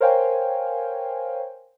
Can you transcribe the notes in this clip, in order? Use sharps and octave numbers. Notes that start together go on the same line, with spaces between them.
A#4 C5 C#5 F5 G5 G#5